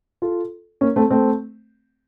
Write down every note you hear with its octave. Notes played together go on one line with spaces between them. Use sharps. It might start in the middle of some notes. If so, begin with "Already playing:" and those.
F4 A4
A#3 C#4
A3 C4
A3 C4